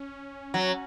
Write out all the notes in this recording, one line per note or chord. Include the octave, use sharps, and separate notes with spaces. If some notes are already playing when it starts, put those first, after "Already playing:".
Already playing: C#4
F#3